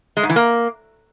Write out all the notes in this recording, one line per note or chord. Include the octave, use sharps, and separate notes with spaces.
G#3
G#2
E3
A#3